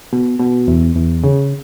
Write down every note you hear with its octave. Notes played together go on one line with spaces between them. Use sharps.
B2
B2
E2
E2
C#3